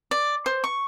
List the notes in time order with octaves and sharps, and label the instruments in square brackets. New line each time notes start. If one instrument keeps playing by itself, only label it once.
[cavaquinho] D5
C5
C#6